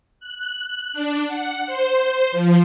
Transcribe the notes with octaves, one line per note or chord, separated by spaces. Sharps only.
F#6
D4
F#5
C5
F3